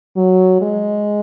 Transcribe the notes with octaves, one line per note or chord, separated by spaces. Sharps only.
F#3
G#3